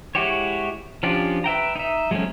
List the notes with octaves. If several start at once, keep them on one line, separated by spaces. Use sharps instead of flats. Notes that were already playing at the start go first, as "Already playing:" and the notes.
G#3 E4 F#4 G4 C#5
F3 C#4 D4 F4 G4
B4 E5 G5 A#5
D#4 E5
F#3 G#3 A3 C4 C#4